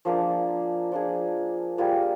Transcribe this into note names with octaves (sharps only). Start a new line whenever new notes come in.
F3 A#3 D4 G#4
F3 A#3 D4 G#4
G3 A#3 F4 G#4